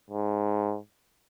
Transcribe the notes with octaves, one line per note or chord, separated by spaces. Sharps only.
G#2